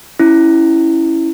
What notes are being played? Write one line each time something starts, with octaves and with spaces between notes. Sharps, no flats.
C#4 E4